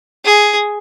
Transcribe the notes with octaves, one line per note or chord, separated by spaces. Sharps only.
G#4